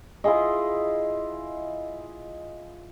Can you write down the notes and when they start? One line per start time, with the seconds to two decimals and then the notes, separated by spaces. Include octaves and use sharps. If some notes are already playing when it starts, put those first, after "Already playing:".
0.24 E4 F4 G#4 D#5